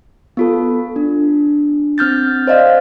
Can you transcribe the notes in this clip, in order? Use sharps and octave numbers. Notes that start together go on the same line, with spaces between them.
B3 F4 A4
D4
C4 F6 G6 A6
C5 D5 D#5 F5